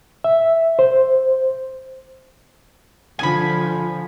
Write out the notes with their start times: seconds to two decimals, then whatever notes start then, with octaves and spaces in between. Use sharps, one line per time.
0.24 E5
0.79 C5
3.19 D3 F3 G#5 B5